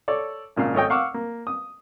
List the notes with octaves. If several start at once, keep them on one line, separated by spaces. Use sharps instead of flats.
A4 C#5 D5
G#1 A#2 C#3 F5 F6
G#1 A3 C#5 D#5 G5
F5 F#5 C#6 D6 E6 F6
A#3
D#6